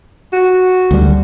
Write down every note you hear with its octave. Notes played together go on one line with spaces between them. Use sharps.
F#4
D2 G3